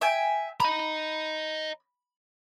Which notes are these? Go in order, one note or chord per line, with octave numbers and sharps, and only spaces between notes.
E5 G5 G#5
D#5 A#5 B5